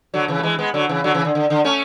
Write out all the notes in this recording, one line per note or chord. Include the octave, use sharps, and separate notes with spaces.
D3 F#3
C#3 E3
A3
E3 G#3
G#3 B3
D3 F#3
C#3 E3
D3 F#3
C#3 E3
D3
D3
D3
A3 C#4